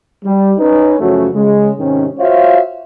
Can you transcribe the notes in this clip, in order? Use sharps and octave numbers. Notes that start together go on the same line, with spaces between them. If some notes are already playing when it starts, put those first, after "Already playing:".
G3
C#4 D#4 B4
F#2 C#3 F3 A3 C#4 F#4
C#3 G#3
G#2 C3 D#3 C#4
F4 F#4 C5 C#5 E5 F5